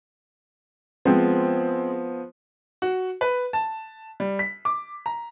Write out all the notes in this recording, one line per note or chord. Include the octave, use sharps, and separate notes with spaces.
F3 G#3 B3 C4
F#4
B4
A5
G3
B6
D6
A#5